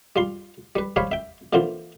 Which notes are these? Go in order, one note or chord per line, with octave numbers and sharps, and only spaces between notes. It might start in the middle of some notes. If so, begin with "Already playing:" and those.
G3 F4 C6
G3 B4
G3 C5 C#5 F5 B5
E5 G5
A#2 D3 E3 C4 F4